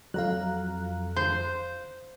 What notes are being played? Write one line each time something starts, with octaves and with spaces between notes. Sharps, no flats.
F2 F#3 F5 A#5 F#6
C5 G6